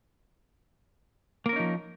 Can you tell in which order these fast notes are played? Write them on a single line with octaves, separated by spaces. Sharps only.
A#3 A#4 C#4 D#4 F3